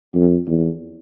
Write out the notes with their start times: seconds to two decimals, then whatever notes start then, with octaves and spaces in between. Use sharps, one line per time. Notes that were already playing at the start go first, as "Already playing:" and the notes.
0.14 F2
0.47 E2